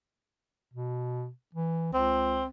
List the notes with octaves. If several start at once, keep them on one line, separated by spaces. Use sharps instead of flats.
B2
E3
C#2 C4